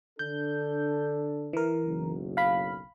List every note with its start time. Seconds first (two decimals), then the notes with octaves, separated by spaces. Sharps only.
0.19 D3 D4 A4 G6
1.53 E3 A#4
1.85 F#1 B1 F#2
2.37 F5 B5